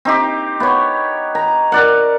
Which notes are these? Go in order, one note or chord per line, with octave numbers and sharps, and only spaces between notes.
C4 D#4 G4
B3 C#5
A#5
A#4 D5 F#5